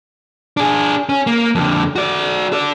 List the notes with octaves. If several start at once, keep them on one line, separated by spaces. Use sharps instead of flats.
D4 G#4
C#4
A#3
F2 D3
F#4 D5
A4 D5